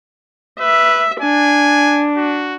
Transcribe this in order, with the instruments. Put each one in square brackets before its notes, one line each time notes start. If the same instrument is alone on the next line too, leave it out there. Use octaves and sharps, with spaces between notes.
[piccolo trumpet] B4 [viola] E5
[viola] D4 [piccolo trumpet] G#5
[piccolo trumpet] F#4